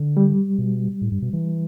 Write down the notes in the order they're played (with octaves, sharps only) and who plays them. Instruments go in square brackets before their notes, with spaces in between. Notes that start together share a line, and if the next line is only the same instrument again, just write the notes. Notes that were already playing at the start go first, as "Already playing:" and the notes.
Already playing: [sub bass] D3
[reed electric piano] G3
[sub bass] B2
A2
G2
B2
E3